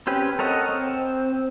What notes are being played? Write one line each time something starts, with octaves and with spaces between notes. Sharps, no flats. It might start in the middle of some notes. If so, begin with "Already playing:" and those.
C4 C#4 G4 B4
A4 A#4 C#5 D#5 F#5
C4